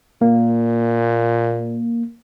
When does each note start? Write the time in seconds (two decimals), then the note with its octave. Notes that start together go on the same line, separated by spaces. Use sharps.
0.21 A#2 A#3